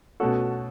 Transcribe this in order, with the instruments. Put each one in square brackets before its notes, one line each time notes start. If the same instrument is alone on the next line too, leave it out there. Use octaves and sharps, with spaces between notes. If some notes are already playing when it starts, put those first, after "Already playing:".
[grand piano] B2 A3 C#4 [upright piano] F#4 A4